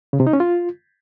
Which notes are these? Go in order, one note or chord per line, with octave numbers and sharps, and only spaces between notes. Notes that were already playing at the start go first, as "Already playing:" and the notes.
C#3
C3
D#4
C#4
F4